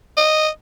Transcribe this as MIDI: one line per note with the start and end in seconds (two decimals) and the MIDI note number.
0.17 0.48 75